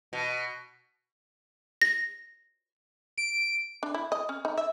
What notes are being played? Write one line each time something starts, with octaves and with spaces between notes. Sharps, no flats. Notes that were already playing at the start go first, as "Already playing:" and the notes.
B2
A#6
D7
D4
E4
D#5
C#4
D#4
E5